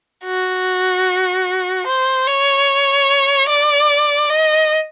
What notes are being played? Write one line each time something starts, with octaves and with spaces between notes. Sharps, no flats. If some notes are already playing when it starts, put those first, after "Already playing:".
F#4
C5
C#5
D5
D#5